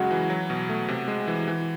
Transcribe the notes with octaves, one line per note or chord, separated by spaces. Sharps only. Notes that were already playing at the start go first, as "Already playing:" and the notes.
Already playing: C#3 F#3 G#3 F#4
E3
F#3
B2
A3
C3
G#3
E3
E3